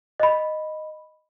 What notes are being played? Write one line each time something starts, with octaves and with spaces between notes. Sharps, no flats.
D#5 B5